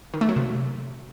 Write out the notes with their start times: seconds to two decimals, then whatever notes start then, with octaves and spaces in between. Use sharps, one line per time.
0.14 D#3
0.21 A3
0.29 F#3
0.36 C3